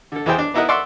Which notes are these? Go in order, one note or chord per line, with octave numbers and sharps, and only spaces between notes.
D3 A4
E2 B3 E4 G#4 C5 G5
D4
B3 D#4 E4 A#4 D#5 F#5
D5 E5 F#5 C6 C#6 E6